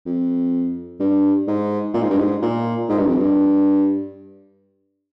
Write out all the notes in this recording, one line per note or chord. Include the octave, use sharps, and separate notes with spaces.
F2
G2
G#2
A#2
G#2
G2
G#2
A#2
G#2
G2
F2
G2